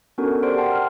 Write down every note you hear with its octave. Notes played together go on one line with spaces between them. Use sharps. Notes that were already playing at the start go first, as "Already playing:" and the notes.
B3 C#4 D4 F#4 A4 A#4
G4 A#4 C5 D5 C6 D7
F#5 G5 A5 C6
F6